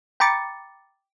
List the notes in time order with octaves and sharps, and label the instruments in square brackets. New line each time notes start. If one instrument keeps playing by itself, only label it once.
[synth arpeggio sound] G5 A#5 B5 D6 A6 C#7